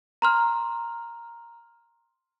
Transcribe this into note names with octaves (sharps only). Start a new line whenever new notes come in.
A#5 C6 F6